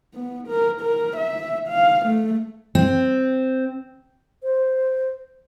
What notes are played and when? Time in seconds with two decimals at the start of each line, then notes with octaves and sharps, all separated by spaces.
0.14 B3
0.48 A#4
0.81 A#4
1.17 E5
1.68 F5
2.06 A3
2.75 C4
4.43 C5